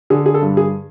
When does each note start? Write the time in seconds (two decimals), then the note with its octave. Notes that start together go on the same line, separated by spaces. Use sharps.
0.10 D3 G#4
0.26 G#4
0.34 A4
0.42 G2
0.57 G#4